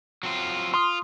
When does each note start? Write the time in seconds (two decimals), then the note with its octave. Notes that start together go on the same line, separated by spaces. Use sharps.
0.23 F#3 C4 F4
0.74 F4 C6 D#6